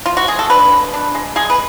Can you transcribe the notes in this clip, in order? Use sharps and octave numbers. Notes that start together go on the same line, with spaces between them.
F4
F#4
G#4
A4
D4 B4
G#3
D4
G#3
G#3 G#4
B4